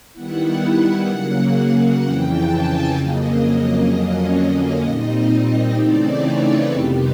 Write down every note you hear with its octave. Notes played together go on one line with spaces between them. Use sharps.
D#3 G3 B3 E4 F#5
C#3 F#3 A#3
F2 C#3 E3 G5
A5
G#5
F2 C#3 F#3 A#3 D#5
F2 D3 F#3 A#3 C#4
A#2 G3 C4 D#4 D#5
C#3 E3 A3 C4 D#4 D5
C#5
B4
F2 C3 D#3 G3 B3 G4